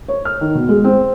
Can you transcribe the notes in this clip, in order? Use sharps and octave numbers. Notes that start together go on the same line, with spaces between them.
C#5
F6
D#3
B2
G#3
C4